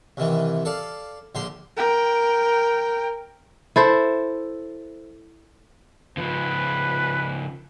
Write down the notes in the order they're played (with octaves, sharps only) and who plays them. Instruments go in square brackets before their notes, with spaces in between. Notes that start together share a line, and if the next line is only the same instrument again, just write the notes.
[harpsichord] C2 C3 D#3 E3
A4 D5 F5
A#1 D3 G4 C6
[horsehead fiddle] A#4 G5
[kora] E4 A4 C5
[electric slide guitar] C#3 F3 [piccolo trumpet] B4